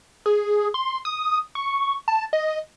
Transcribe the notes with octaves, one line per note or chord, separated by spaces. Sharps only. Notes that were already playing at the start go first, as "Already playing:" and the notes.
G#4
C6
D#6
C#6
A5
D#5